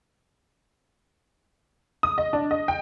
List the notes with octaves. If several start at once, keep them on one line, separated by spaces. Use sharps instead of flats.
D#6
D#5
D4
D#5
G5